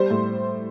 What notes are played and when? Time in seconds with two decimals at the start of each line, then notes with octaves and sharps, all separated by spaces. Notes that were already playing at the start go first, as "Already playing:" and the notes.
Already playing: G3 C5
0.10 A2